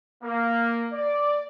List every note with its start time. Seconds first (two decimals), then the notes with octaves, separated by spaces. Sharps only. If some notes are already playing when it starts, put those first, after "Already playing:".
0.24 A#3
0.93 D5